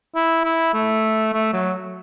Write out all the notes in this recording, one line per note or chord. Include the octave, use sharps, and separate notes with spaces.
E4
E4
A3
A3
F#3